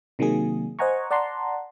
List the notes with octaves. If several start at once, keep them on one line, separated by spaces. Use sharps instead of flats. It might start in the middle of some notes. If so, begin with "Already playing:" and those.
C3 D#3 F#3 A#3 G#4
C5 D#5 F#5 G#5 A#5 C#6
D5 F#5 A5 A#5 C6